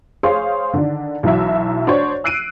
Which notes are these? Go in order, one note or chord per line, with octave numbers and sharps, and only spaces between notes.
G#4 C5 C#5 F5 C6
D3 D#3 D4
B1 E3 F#3 E5
D4 F#4 C5 C#5
E6 F#6 C7 D7 D#7